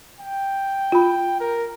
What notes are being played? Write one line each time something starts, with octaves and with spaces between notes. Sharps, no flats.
G5
F4 B5
A#4